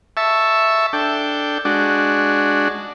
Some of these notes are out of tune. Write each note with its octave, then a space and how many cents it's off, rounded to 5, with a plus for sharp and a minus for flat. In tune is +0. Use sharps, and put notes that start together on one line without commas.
E5 +0 A5 +0 C#6 +0
D4 +0 A4 +0 G5 +0
G#3 +0 D4 +0 F#4 +0